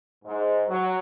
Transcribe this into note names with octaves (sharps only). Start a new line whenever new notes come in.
G#2
F#3